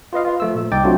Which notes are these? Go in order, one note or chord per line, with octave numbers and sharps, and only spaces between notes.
F4 B4 D#5 F5
F4 B4
F3 A3 E6
A#2
C2 D#4 G5 D6 A6
F#3 A3 C4 D4 F4 F#4